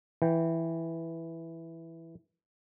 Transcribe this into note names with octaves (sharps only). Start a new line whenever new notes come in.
E3 G5